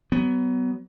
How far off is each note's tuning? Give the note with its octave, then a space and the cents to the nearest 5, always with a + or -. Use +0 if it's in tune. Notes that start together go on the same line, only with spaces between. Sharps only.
F#3 +35 B3 +15